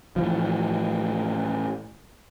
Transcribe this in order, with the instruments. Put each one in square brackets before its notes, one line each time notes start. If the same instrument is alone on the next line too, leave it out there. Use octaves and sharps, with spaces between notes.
[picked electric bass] A2 E3 F3